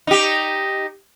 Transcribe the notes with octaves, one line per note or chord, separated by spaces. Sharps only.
D#4 G4